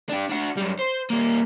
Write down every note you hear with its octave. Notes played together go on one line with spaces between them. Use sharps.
D4 G4
D4 F#4
F#2 G3
C5
G3 A#3